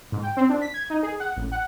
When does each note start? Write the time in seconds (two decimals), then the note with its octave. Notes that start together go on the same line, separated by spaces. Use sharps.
0.12 G#2
0.23 G5
0.37 C4
0.49 D4
0.62 B6
0.74 G#6
0.90 D#4
1.03 G#4
1.20 F#5
1.37 A1
1.52 F#5